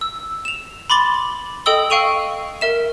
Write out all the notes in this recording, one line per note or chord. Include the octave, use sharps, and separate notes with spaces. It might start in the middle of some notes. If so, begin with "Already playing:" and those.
E6
E7 F7
B5 C6 D6 A6 F#7 G7
A4 D#5 G5 D#6 E6 G7
F5 G5 C#6 D#7 F7
A#4 E5 E7